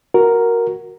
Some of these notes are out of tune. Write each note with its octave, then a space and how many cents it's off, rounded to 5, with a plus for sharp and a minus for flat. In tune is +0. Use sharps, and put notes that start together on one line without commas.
F#4 +0 A#4 +0